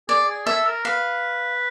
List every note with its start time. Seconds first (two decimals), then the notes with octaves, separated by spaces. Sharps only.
0.08 G#4 D5
0.28 G#4
0.46 A4 E5
0.66 A#4
0.84 B4 F5